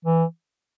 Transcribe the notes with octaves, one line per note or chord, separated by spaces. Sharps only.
E3